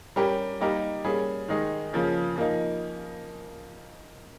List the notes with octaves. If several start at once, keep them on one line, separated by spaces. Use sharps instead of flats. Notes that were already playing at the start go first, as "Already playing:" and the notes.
G3 C#4 G4 A#4
G3 A#3 D#4 G4 A#4
G3 A#3 C#4 G#4
D#3 G#3 D#4 G#4
C#3 F3 A#3
F3 A#3 D#4